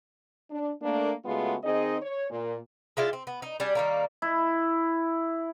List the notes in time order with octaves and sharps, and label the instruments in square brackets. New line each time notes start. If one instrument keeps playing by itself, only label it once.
[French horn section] D4
A3 A#3 D4
C#3 G#3 A3 B3 F4 F#4
D#3 C4 D#4 G#4 D#5
C#5
A#2
[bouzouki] G#3 E4 F4 D5
C4
B3
D#4
G3 D4 G#4
D#3 G3 A#3
[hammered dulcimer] E4